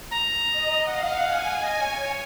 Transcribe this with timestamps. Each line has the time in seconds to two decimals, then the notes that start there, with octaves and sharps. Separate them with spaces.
0.11 A#5
0.49 D#5
0.86 F5 F#5
1.24 G#5
1.62 D#5 G#5
1.81 C#5
2.01 C#5